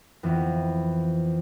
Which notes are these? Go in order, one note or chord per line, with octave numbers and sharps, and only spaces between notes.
F2 E3 B3